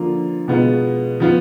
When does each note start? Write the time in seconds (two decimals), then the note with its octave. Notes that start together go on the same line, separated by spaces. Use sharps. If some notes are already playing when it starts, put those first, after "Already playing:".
Already playing: D3 F3 A#3 F4
0.48 B2 G#3 B3 F4
1.20 F3 B3 F4